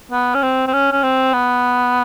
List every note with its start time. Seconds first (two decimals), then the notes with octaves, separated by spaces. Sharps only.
0.11 B3
0.35 C#4
0.42 C4
0.67 C4
0.73 C#4
0.92 C#4
1.03 C4
1.33 B3